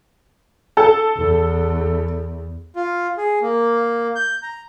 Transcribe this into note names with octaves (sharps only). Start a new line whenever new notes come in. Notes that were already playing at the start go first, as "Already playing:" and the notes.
A4 A5
E2
F4
G#4
A#3
G6
A#5